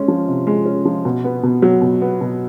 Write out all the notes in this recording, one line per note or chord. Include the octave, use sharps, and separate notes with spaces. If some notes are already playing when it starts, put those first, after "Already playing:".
Already playing: G#3 C#4
F3
C3
G#3
C#4
F3
B2
B3
B2
F#3
B2
B3
B2